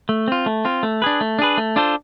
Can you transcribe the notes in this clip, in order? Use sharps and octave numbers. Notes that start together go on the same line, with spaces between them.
A3
C4 F4
A3
C4 F4
A3
D4 G#4 B4
A3
D4 G#4 B4
A3
D4 F4 A4 C5